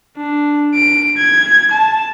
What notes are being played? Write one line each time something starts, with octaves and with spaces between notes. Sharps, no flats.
D4
D7
G#6
A5